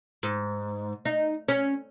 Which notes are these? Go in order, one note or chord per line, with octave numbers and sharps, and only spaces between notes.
G#2
D#4
C#4